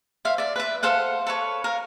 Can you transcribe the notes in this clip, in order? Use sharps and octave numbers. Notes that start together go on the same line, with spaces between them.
C5 E5 F5
D5 E5
B4 E5
A4 C5 F5 F#5
A4 B4 C#5
A#4 F5